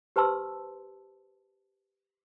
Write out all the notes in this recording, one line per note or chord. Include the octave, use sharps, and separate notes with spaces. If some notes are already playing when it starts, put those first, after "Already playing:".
G4 B4 C5 A5 C6 E6